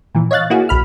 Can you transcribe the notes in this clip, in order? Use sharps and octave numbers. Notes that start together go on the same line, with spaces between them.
A#2 E3
C#5 D#5 F5 F#6 A6
A#3 E4 F#4 G#4
B1 B5 F6